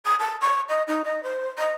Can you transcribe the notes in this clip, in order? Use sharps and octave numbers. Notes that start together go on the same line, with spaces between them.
D#6
A5
C#6
D#5
D#4
D#5
C5
D#5